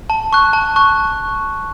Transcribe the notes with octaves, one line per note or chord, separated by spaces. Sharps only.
A5
C#6 F#6
A5
C#6 F#6